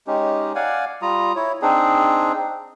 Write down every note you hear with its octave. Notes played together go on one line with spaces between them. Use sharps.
G#3 C#4 D#4 G4
D5 F5 F#5 G#5
G3 F4 A#5 D#6
E4 C#5
C4 D4 D#4 G#4